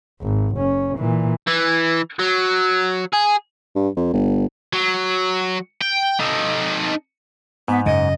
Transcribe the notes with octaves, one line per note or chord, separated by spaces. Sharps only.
G#1
F#1 C#4
A#2 E3
E3
F#3
G#4
G2
F2
G1
F#3
G5
D#4 A4
G#2 B3
F#2 C#3 D#5